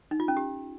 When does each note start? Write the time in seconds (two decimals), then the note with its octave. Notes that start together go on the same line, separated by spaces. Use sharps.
0.11 D#4
0.20 F4
0.28 C#4
0.37 G4